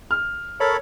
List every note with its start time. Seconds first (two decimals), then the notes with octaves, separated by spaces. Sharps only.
0.11 F6
0.60 A4 A#4 C#5 B5